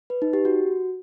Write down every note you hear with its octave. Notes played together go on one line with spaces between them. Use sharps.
B4
D#4
G4
F#4